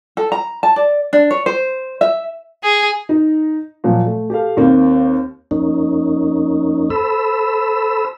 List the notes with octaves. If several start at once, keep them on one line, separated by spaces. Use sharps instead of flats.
A4
A#5
A5
D5
D4
C#5
C5
E5
G#4
D#4
A#2 F3 F#3
A3
G4 A4 F5
D#2 A#3 C4
F2 A#3 C#4 D#4
A4 C5 B5 E6